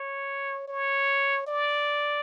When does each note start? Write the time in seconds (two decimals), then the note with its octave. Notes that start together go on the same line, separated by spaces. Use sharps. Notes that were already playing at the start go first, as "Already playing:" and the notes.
Already playing: C#5
0.68 C#5
1.47 D5